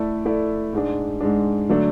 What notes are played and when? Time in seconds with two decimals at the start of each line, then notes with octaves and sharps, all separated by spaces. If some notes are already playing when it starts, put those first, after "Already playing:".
Already playing: A3 E4 A4 D5
0.25 A3 E4 A4 D5
0.73 G#2 G#3 D4
1.21 G#2 G#3 D4
1.69 D3 F#3 A3 D4